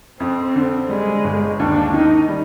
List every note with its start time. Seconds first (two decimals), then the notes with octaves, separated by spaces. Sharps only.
0.20 F2 C4
0.55 D3
0.90 G3 G#3
1.24 G1
1.59 D#2 D4
1.93 D#3 D#4
2.28 G3